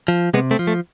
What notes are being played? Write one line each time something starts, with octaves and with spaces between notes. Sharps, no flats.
F3
C3 G#3 B3
A3 C4
F3
A3